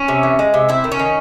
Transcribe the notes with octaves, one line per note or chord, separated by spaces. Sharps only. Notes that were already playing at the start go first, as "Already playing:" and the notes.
Already playing: C#4
C3
E3
G#3
C3
C4 E4
D#3
C#4
D#3